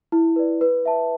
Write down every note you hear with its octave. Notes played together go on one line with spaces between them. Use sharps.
E4
B4 D5
B4
E5 A5